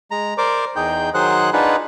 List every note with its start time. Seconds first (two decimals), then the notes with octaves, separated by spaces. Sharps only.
0.11 G#3 A#5
0.38 A#4 C5 D5 D6
0.76 E2 D#4 G#4 G5 G6
1.14 D#3 F#3 G#4 C5 F#5 F#6
1.53 D4 D#4 F4 G#4 B4 F#5